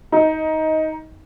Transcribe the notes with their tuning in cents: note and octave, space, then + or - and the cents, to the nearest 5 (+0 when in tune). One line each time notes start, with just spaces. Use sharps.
D#4 +15